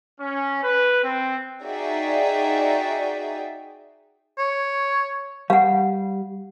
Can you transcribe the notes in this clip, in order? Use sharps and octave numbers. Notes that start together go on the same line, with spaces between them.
C#4
B4
C4
D#4 F#4 G#4 D5 E5 G5
C#5
G3 F5 F#5